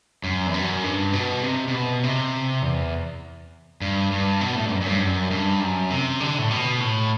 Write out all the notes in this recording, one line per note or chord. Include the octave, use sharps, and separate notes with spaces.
F#2
E2
F#2
G2
B2
C3
C3
B2
C3
E2
G2
G2
B2
A2
G2
F#2
F#2
G2
F#2
G2
F#2
C3
D3
A2
B2
A2